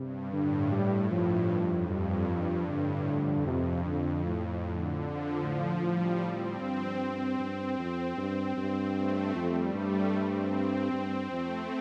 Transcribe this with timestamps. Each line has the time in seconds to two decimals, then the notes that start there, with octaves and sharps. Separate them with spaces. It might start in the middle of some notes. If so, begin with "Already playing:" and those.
Already playing: G2 C3
0.32 A2 D3
0.72 G3
1.11 G2 F3
1.51 F2
1.89 G2 G3
2.29 F3
2.68 A2 D3
3.07 F2
3.47 C3
3.86 D3
4.25 A2
4.64 D3
5.04 F3
5.42 A2
5.82 A2 G3
6.22 C4
6.60 G2
7.00 C4
7.39 G2 C4
7.79 F2
8.17 G2
8.57 G2
8.96 A3
9.35 F2 G3
9.74 G2 A3
10.14 C4
10.92 G2
11.31 F2 A3